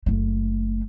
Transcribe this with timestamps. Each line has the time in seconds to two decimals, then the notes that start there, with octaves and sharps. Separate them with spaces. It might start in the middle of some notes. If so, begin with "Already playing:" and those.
0.06 F#1 A3